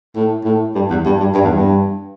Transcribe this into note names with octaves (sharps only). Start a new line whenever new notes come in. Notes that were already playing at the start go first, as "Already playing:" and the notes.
A2
A2
G2
E2
G2
G2
G2
E2
G2